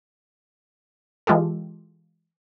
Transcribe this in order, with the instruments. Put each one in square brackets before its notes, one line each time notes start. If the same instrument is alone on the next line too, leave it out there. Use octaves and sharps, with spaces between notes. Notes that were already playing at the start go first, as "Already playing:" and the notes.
[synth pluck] E3 G#3 F4 G4 A4